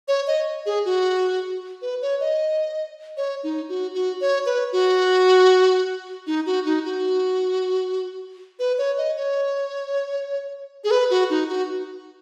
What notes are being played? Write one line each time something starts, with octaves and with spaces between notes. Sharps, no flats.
C#5
D#5
G#4
F#4
B4
C#5
D#5
C#5
D#4
F#4
F#4
C#5
B4
F#4
D#4
F#4
D#4
F#4
B4
C#5
D#5
C#5
G#4
B4
F#4
D#4
F#4